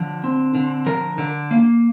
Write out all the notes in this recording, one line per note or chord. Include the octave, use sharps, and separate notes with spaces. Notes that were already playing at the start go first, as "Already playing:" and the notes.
Already playing: D3 F3
C4
D3
F3 A#4
D3
A#3